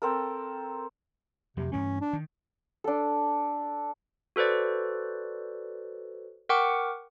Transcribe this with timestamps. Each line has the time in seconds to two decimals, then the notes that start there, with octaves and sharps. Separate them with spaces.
0.02 C4 A4 A#4
1.57 F2 C3 F#3 A#3
1.72 G2 E3 A3 C#4
2.01 D4
2.13 D#3
2.84 D4 A4
4.36 F#4 A4 B4 C5 D5
6.49 A#4 F#5 G5 C#6 D6